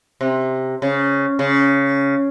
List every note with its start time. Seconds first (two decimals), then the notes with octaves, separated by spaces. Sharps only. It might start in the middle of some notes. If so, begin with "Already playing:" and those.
0.21 C3
0.82 C#3
1.39 C#3